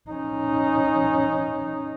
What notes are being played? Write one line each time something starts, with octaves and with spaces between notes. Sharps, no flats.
C#4 D#4